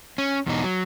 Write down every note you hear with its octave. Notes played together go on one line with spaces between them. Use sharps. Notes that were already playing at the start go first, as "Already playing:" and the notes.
C#4
E2 B2 D#4
F#3